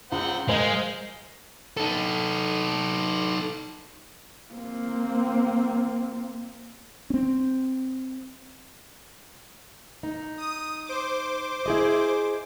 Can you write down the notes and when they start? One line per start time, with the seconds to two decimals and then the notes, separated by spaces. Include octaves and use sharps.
0.12 C#2 C5 F#5 G5
0.49 G#3 A#4 C5 D#5 F5 G#5
1.77 D#4 A4
4.53 A#3 C4
7.10 C4 C#4
10.03 D#4
10.38 D#6
10.85 C5 D6
11.66 E4 G#4 D#5